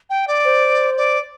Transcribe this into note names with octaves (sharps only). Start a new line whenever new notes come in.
G5
D5
C5
D5